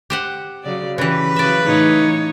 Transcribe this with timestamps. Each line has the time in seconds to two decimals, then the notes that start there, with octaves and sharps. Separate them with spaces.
0.10 G4 C5 F#5
0.64 C#3 F#3 D5
0.98 C#3 E3 G4 B4
1.36 C#3 F#3 D5 E5
1.65 A2 C#3 E3 D#4 C#5